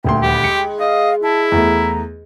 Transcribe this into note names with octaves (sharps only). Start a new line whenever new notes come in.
D#1 D2 G5 C6
D#3 G3 B3 G4
G#3 C#7
D#5 F5
E4 A5
E2 A3 A#5